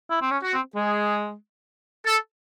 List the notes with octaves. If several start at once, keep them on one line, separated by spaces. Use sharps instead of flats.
E4
C4
C#4
F#4
C4
G#3 G#4
A4